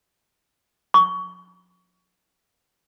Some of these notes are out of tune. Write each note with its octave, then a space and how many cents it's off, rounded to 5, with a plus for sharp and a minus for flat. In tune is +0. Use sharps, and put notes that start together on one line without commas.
C#6 +25